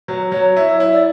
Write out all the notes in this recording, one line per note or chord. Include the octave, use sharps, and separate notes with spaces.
F#3
F#3 C#5
E4
E4
D5